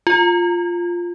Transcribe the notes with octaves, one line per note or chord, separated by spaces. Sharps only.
F4